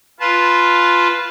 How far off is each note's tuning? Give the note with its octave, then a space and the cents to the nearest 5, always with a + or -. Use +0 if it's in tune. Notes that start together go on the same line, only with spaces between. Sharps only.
F4 +0 B4 +0 A5 -20